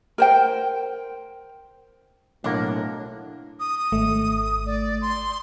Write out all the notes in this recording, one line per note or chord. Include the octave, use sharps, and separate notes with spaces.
A#4 C5 G5
B1 A2 A#3 D4 F#4
D#6
G#1 A3
D5
C6